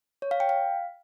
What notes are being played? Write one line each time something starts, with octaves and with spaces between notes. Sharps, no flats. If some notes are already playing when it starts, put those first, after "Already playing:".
C#5
F5
G5
F5